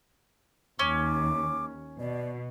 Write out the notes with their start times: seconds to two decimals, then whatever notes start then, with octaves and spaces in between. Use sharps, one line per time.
0.79 D#2 C#4 D6
1.99 B2 D5